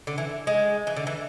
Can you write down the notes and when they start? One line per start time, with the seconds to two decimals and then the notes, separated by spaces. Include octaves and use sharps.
0.07 D3
0.18 E3
0.47 G#3
0.87 E3
0.96 D3
1.07 E3